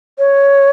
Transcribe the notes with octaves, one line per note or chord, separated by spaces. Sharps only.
C#5